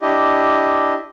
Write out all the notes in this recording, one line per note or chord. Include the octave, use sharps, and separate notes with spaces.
D4 E4 G4 D#5